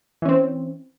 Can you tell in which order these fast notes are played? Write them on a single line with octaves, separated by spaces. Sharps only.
E3 C#4 C4